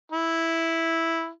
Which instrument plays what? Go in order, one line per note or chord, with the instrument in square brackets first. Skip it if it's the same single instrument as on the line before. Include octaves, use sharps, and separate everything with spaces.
[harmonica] E4